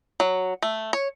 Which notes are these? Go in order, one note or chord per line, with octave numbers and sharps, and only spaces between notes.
F#3
A3
C#5